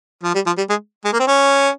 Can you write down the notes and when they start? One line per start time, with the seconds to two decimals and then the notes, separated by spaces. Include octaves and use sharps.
0.24 F3
0.35 G3
0.47 F3
0.58 G3
0.70 G#3
1.05 G#3
1.13 A#3
1.20 C4
1.28 C#4